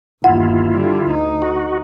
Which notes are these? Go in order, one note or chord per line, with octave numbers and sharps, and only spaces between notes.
G1 D#2 E4 F4 F#5
D3 G3
D2 D#4
F#4